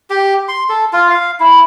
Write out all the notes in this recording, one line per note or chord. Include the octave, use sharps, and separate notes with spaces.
G4
C6
A4
F4
F5
E4